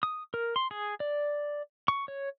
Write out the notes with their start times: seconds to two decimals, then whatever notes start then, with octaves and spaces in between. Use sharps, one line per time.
0.03 D#6
0.34 A#4
0.56 C6
0.71 G#4
1.00 D5
1.88 C#6
2.08 C#5